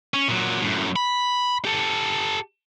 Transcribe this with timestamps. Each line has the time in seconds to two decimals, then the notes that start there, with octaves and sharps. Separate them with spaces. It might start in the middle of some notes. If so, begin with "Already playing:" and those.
0.14 C#4
0.28 A#2 F#3
0.62 F#2 A2
0.96 B5
1.65 G4 A4